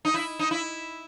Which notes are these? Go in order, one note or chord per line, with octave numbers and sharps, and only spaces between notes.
D#4
E4
D#4
E4